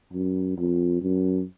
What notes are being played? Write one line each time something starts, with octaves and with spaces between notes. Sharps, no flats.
F#2
F2
F#2